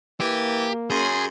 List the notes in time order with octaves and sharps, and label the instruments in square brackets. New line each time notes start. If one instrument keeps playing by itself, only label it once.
[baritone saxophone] E3 [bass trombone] A#3 [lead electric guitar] G4
[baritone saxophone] F#2 [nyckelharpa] C#4 C6 [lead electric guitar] G#4